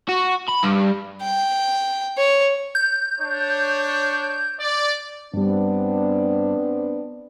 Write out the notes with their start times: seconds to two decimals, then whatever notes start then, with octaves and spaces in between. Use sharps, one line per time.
0.09 F#4
0.48 B5
0.63 G2
1.23 G5
2.18 C#5
2.75 G6
3.19 D4 C#5
4.59 D5
5.34 G2 G3 B3 C4 D4